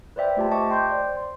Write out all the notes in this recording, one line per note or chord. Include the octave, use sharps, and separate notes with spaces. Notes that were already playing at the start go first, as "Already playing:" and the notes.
B4 C5 D5 E5 G5
A3 F4 G4 C5 A5
D#5 E5 A5 C#6 D6
G5 C6 D6 G6
C5 D5
C6